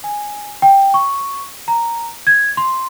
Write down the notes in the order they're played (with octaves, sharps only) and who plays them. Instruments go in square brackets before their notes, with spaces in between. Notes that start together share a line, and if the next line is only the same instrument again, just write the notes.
[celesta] G#5
G5
C#6
A#5
G#6
C6